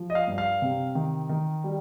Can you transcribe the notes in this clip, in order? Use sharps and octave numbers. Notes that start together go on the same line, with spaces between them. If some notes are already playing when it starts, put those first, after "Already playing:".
Already playing: F3
D#5
F5
G2
F5
C3
D#3
D#3
G3